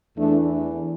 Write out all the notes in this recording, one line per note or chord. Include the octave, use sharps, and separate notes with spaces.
E2 E3 A3 D4